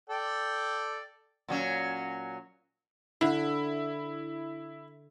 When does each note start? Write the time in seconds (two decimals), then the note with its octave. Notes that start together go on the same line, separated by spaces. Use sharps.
0.10 A4 D5 G5
1.48 A#2 F#3 C#4
3.21 D3 E4